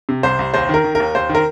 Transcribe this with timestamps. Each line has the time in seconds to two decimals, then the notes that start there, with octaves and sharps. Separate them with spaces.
0.09 C3
0.23 C2 C5
0.39 C2
0.54 D#2 C5
0.69 D#3 A#4
0.84 D#3
0.95 D#2 A#4
1.15 D#2 C5
1.29 D#3
1.35 A#4